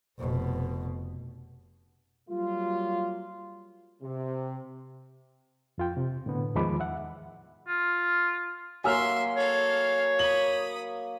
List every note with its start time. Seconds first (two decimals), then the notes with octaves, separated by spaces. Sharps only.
0.19 F1 B2
2.29 F#3 G3 A#3 F4
4.02 C3
5.78 F2 F4 G5
5.97 C3
6.26 A2 D3 B3
6.55 E2 D#3 F3 G#3 B5 D6
6.80 E5 F#5
7.68 F4
8.84 F#3 A#3 E5 G#5 C6 E6 F6
9.37 A4 C#5 F5
10.19 B5 D#6 F#7